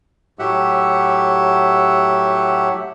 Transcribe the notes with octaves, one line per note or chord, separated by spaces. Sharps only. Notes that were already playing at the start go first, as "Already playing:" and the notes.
A2 F#3 G4 E5 F#5